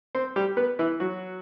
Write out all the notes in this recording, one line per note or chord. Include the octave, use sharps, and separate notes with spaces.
C4 C5
G3 G4
B3 B4
E3 E4
F#3 F#4